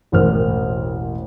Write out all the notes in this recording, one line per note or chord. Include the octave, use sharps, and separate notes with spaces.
E1 A1 A#4 C5 F6